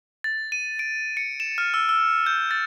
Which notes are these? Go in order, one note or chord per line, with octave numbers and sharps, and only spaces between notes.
A6
D#7
D7
C#7
E7
F6
E6
E6
G6
A6